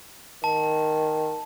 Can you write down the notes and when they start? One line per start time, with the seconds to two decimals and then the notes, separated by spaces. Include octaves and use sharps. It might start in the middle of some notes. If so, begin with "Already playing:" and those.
0.44 D#3 A5